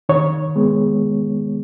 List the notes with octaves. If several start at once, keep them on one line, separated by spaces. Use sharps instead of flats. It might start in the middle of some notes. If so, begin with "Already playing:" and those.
D#3 C#5
G#3 B3